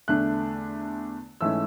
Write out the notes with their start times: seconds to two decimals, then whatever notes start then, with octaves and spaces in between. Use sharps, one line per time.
0.08 E2 D3 A3 D4 F#6
1.41 G#2 E3 A3 C#4 E6